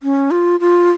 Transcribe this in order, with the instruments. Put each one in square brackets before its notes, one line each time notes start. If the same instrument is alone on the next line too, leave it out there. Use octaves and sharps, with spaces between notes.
[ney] C#4
F4
F4